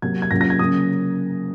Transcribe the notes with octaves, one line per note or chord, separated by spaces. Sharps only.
C3 F#3 A#3 G#6
G#6
C3 F#3 A#3 C#4 F4 A#6
A#6
G#6
C#3 F#3 A#3 C#4 D#6